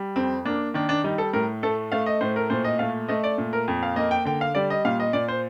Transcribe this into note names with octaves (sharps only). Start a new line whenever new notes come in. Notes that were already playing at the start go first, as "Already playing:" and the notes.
Already playing: G3
F2 C4
A#3 D4
D#3 D4
D4
G3 D#4
A4
A2 A#4
A3 A4
A3 F5
D#5
A2 C5
A#4
A#2 C5
D#5
A3 F5
A3 D#5
D5
A#2
A#4
F2
F5
A#3 D#5
G5
D3 G5
F5
G3 D5
D#5
A#2 F5
D#5
A#2 D5
C5